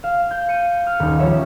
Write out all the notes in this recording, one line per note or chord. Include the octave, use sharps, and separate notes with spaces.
F5 E7
G6
C#7 D#7
F6
D#1 D#4
F3 G3 C#4 C#5 E5